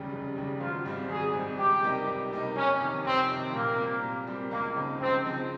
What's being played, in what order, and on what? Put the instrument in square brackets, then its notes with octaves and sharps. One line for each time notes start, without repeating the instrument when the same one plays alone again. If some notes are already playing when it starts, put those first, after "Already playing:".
Already playing: [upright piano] F1 D#2 C#3 G3
F1
D#2 C#3 G3
[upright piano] G#1 [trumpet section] F4
[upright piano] G#2 G3 C4
[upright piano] G#1 [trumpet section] G#4
[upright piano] G#2 G3 C4
[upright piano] C#2 [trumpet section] G4
[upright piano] C3 G3 A#3 D#4
C#2
C3 G3 A#3 D#4
[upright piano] F2 [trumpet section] C#4
[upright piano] C3 D#3
[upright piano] F2 [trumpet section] C4
[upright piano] C3 D#3
[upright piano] A#2 [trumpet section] A#3
[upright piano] G3 C4 G4 A#4
A#2
G3 C4 G4 A#4
[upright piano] C#2 [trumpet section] A#3
[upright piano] C#3 F3 C4 D#4
[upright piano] C#2 [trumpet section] C4
[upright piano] C#3 F3 C4 D#4